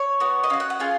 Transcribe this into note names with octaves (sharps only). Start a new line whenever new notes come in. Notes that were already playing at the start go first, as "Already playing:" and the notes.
Already playing: C#5
B3 F#4
D#5
C#4 F#4 F5
F#5
F#5
C#4 F4 G#4 F5